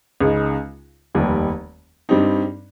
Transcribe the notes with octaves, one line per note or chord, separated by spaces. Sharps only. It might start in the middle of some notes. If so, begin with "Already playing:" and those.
C#2 C#3 G#3 D#4
F1 D#2 D#3 G3
G2 G3 C4 D#4